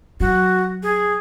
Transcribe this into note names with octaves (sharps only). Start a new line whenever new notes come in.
F#3 F#4
G#4